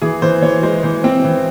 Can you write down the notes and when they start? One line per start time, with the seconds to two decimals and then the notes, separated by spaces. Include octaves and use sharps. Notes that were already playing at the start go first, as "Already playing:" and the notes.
0.02 E3 G#4
0.22 E3 C5
0.42 E3 C#5
0.63 G#3 C5
0.83 E3 C5
1.04 C4
1.24 E3